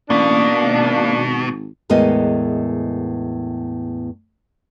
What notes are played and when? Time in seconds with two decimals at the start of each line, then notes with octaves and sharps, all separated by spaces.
0.10 A1 B2 A#3 D4
0.62 G#1
1.90 E2 A2 G#3 B3 A#4 D#5